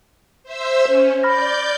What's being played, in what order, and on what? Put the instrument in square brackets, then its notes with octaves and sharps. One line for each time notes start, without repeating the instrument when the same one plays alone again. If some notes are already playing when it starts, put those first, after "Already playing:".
[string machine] C5 E5 E6
[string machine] C#4 [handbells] C5
[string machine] D5 G6 [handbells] B5 F6 A#6